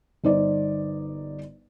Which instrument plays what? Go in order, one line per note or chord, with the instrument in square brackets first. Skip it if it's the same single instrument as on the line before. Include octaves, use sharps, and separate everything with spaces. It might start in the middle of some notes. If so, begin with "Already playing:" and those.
[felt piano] G1 D#4 C5 D5